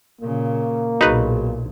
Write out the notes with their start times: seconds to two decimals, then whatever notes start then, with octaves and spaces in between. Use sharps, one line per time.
0.21 A#2 C#3 A#3
1.01 B1 A#2 D#4 F#4 G#4 B4